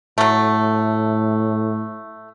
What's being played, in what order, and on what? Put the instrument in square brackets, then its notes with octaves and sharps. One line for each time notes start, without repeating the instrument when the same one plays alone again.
[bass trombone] A2 [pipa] F#3 A3